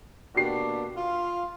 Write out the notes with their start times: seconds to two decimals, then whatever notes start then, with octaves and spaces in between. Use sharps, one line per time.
0.35 B2 A#3 D4 F#4 G4 C7
0.95 F4 F5